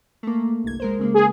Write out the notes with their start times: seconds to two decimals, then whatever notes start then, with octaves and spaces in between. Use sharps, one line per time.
0.23 A3 A#3
0.64 G1 C2 G#6
0.80 G#3 A#4 C5
0.99 C#3 G#3 A#3
1.14 G#4